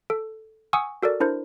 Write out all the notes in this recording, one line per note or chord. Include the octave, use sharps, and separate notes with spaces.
A4
F#5 G#5 C#6 D#6 E6
F#4 A4 A#4 D5
D4 E4 A#4 C5